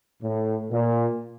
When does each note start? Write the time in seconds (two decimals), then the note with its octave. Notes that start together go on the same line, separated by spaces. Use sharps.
0.22 A2
0.71 A#2